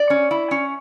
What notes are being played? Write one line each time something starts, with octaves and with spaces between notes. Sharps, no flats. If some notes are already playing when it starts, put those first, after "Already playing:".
Already playing: D5
C#4
E4
C#4